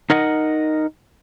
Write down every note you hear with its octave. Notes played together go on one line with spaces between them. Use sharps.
D#4 A#4 D#5 F#5